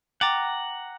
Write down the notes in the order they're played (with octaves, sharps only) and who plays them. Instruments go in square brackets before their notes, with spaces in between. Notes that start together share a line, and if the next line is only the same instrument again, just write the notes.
[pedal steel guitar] F#5 A#5 [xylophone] G5 D6 A6